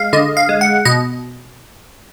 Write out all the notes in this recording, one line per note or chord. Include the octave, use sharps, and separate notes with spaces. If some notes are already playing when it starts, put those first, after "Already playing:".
Already playing: G#3 F5
D3 D#5
F5
G#3
F#5
B2 D#5